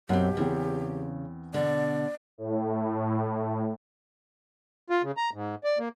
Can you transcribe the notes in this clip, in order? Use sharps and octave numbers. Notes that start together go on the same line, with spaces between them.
B1 F#2 C4 G4 F#5
E2 C#3 E3 C4
B2 D3 D5
A2
F4
C#3
A#5
G#2
D5
A#3